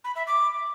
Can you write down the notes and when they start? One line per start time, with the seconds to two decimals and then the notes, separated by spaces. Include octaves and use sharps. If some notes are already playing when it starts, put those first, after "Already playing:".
0.04 B5
0.16 E5
0.27 D6